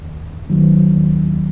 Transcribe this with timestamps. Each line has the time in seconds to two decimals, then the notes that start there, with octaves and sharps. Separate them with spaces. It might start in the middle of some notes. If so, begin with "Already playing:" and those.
0.01 D#2
0.50 D#3 F#3
0.96 D#2